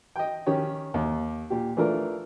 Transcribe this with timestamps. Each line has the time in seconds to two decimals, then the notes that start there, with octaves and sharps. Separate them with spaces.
0.16 D#5 G5
0.47 D#3 C#4 G4 C#5
0.94 D#2
1.50 A#2 G4
1.77 E3 A3 D4 F4 A#4